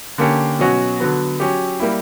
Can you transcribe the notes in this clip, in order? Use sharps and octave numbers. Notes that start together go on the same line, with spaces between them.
D3 A#3 C#4 G4
B2 F#3 C#4 F#4
D3 F#3 B3
F#3 C#4 G4
G3 A#3 E4